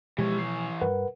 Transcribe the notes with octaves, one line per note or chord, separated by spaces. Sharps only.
B2 E3 F3 G#3 G4 C#5
C7
G2 A#4 B4 F#5